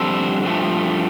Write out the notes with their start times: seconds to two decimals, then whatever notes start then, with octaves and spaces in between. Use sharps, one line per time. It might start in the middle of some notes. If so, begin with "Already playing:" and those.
Already playing: F2 D3 G3 A4 C5
0.45 G2 F3 A3